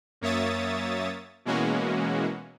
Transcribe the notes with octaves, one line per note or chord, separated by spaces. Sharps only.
F#2 A#3 C#5 E5 D#6 A6
B2 E3 G#3 A#3 C#4 F#4